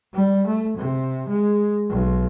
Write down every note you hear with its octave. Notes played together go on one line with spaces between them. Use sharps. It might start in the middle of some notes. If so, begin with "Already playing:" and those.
G3
A3
C3
G#3
B1